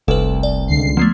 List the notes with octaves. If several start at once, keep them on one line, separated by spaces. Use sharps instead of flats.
F1 C2 A4 B4
D5
C#2 D3 C7
F3 G#3 A3 B3